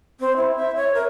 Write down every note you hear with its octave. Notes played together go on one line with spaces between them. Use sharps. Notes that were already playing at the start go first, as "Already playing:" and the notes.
C4
E4
E5
C#5
A#4